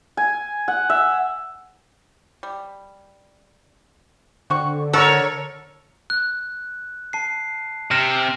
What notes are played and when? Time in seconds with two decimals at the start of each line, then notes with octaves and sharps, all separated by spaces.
0.17 G#5
0.68 F#5
0.90 E5
2.43 G3
4.50 D3 C4 F#4 C#6
4.93 A4 A#4 C#5 F#5 A5 C#6
6.10 F#6
7.13 A5 C7
7.91 C3 F6 A#6 E7